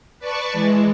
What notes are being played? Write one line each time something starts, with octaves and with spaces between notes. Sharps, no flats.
B4 D5 A5 C#6
E3 G#3